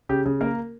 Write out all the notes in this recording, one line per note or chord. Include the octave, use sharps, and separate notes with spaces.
C#3 G4
C#3
A#3 A#4